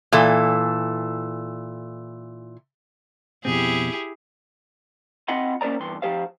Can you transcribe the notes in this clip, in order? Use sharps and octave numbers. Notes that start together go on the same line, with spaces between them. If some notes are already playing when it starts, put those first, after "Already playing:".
A#2 E3 A4
F2 B2 C4 E4 G4 G#4
C4 F4 D#5 F#5 B5 C6
A#3 C#4 A#4 C5 D5 A#5
E2 G2 C6
F3 G4 C5 F5